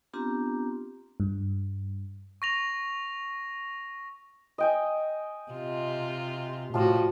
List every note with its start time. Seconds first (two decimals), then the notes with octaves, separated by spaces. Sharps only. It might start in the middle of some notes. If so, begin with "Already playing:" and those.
0.14 B3 C4 D4 F4 G4 A#5
1.20 G2
2.42 C#6 A#6 F7
4.58 D#5 G5 G#5
5.52 C3 F4
6.74 A2 F3 G3 F4 F#4